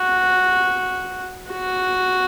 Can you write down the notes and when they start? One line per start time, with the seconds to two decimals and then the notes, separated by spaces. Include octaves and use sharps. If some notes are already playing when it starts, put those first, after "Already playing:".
Already playing: F#4
1.51 F#4